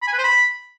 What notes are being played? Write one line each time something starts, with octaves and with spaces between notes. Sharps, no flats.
B5
G#5
B4
C5
B5